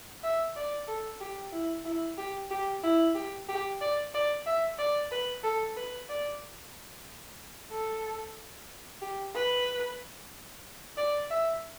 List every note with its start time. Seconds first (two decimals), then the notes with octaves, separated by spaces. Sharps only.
0.23 E5
0.56 D5
0.88 A4
1.21 G4
1.53 E4
1.85 E4
2.18 G4
2.51 G4
2.83 E4
3.16 G4
3.49 G4
3.81 D5
4.14 D5
4.46 E5
4.79 D5
5.12 B4
5.44 A4
5.77 B4
6.09 D5
7.72 A4
9.02 G4
9.35 B4
10.98 D5
11.31 E5